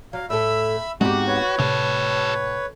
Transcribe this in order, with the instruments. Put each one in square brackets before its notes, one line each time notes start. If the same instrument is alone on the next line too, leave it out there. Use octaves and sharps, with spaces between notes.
[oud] F#3 [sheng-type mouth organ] F5
[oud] A2 A4 [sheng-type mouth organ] E5 B5 E6
[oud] G#2 G4 [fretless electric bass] G#3 B3 C4 [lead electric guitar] F#4
[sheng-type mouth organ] B4 C#5
[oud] A2 [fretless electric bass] C3 [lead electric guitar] G4 A4